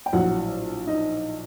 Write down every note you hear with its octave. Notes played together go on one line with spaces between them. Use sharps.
G5
A#1 A2 F#3 F#4 F#5
D#4 D#5